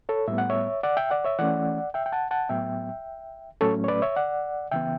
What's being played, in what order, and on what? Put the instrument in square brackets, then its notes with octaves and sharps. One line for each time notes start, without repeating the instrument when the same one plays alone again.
[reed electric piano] A4 C#5
A2 G3 B3 E5
F#5
C#5 E5
D5 F#5
E5 G5
D5 F#5
C#5 E5
E3 A3 C#4 D5 F#5
E5 G5
G5
F#5 A5
F#5 A5
A2 F#3 B3 E5 G5
A2 F#3 A3 C#4 A4 C#5
C#5
B4 D5
C#5 E5
D5 F#5
C#3 E3 B3 E5 G5